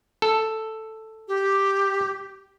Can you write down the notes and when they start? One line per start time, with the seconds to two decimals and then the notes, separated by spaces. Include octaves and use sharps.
0.22 A4
1.28 G4